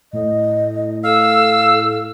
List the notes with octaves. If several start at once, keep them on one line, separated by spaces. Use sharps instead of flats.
A2 D#5
A4 F5 E6